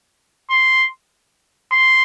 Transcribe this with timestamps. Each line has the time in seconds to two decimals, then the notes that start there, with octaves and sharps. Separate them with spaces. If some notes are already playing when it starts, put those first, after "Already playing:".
0.50 C6
1.72 C6